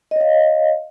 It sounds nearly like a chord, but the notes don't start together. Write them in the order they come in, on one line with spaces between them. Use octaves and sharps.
D#5 C#5 F5